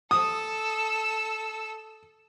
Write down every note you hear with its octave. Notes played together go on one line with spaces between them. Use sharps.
A4 D#6 E6